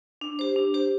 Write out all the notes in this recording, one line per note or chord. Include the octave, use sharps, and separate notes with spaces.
D4
G4 C5
D4
G4 C5